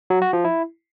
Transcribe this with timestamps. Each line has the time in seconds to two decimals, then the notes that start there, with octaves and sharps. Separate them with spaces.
0.10 F#3
0.22 F#4
0.33 F3
0.44 E4